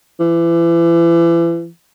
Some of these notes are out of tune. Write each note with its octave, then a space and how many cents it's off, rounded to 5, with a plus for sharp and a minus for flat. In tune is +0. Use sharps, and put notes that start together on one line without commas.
E3 +35